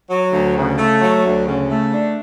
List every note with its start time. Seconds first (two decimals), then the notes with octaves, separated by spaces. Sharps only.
0.10 F#3
0.33 D2
0.56 C#3
0.78 A3
1.01 F#3
1.24 D2
1.46 C#3
1.69 A3
1.92 D4